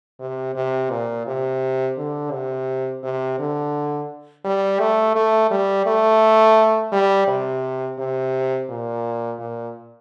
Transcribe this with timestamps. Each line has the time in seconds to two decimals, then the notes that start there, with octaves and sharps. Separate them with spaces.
0.20 C3
0.55 C3
0.91 A#2
1.27 C3
1.97 D3
2.32 C3
3.03 C3
3.39 D3
4.45 G3
4.80 A3
5.15 A3
5.51 G3
5.86 A3
6.92 G3
7.27 C3
7.98 C3
8.69 A#2
9.39 A#2